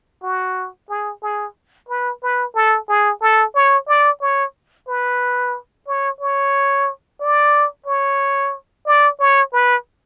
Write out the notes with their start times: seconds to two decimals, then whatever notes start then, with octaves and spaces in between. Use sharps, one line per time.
0.23 F#4
0.89 G#4
1.23 G#4
1.89 B4
2.22 B4
2.55 A4
2.88 G#4
3.21 A4
3.55 C#5
3.88 D5
4.21 C#5
4.88 B4
5.87 C#5
6.20 C#5
7.20 D5
7.86 C#5
8.86 D5
9.20 C#5
9.53 B4